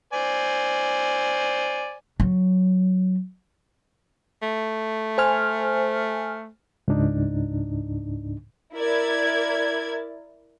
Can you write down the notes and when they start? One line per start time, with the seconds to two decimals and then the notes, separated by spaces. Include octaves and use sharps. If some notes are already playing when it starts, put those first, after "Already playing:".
0.13 C5 D5 G#5
2.20 F#3
4.42 A3
5.18 C5 G#5 F6
6.88 C#2 G#2 D4 D#4
8.74 E4 A#4 D5 G#6